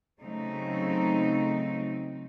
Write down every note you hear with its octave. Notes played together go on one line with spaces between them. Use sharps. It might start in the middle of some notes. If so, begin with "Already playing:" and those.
C#3 F#3 A3 C4 D#4